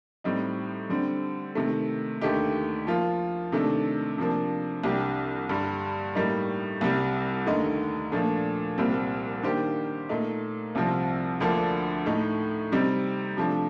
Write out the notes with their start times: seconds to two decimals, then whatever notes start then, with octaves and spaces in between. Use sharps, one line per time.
0.24 A2 G3 C4 D#4
0.90 D3 G3 C4
1.55 C3 D#3 A3
2.21 D#2 D3 A3 D#4 G4
2.87 F3 A#3 F4
3.52 C3 D#3 A3 D4 A4
4.18 C3 F3 A#3 D4
4.84 C2 C3 G3 D4 G4
5.49 G2 D3 G3
6.15 A2 G3 A#3 D#4
6.81 C2 C3 G3
7.46 D#2 D3 A3 D#4
8.12 A#2 F3 A3 D4
8.78 C2 A#2 G3 C4
9.43 D#3 A#3 D4 G4 C5
10.09 A#2 A3 D#4
10.75 C2 C3 F3 C4
11.40 D2 D3 F3 A#3 D4
12.06 A2 A3 D#4
12.72 C3 G3 C4 D#4
13.37 C3 F3 A3 D4